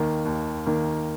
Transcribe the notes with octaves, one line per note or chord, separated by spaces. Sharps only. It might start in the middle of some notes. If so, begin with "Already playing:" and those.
Already playing: D#2 D#3 A#3
D#2
D#3 A#3